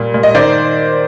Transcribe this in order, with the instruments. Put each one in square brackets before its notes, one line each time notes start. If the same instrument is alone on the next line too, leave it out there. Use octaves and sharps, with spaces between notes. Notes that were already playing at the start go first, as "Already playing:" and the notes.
Already playing: [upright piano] A#2 G3
A#2
D#5
D#3 C5 D5